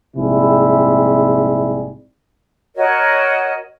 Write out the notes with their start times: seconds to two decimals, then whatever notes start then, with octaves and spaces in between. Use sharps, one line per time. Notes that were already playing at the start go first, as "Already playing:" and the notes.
0.17 A#1 G#2 C3 G3 E4 G#4
2.76 F#4 A#4 C#5 D#5